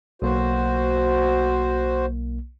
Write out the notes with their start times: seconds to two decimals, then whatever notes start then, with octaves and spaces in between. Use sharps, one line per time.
0.22 B1 A#3 F#4 C5